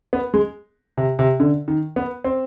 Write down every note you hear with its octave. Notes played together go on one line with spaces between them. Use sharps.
B3
G#3
C3
C3
D3
D#3
B3
C4